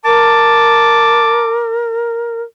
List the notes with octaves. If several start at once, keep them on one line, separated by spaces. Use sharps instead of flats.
A#4 A5 D6